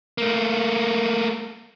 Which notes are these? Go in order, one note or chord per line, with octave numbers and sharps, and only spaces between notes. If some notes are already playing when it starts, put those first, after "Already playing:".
A3 A#3